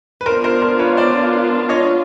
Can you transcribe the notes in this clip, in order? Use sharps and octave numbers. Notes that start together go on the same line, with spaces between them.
B4
B3 D4 F4 A#4 C5
A#4 C5
A#4 C5
B4 C#5
C5 D5
C#5 D#5